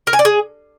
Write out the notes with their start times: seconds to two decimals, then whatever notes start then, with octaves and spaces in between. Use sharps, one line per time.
0.07 A#4
0.13 G#5
0.19 D5
0.25 G#4